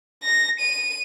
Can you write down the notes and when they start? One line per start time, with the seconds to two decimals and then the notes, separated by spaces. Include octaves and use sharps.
0.24 A#6
0.60 D#7